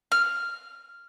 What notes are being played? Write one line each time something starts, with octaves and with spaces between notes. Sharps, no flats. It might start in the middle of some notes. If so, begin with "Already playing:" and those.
F6